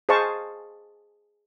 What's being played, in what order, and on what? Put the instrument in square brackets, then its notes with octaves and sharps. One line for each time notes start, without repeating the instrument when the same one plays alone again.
[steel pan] G#4 C5 D#5 F5 A5 C#6